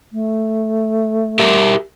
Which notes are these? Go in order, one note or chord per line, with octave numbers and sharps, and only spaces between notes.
A3
G4 A#4 E5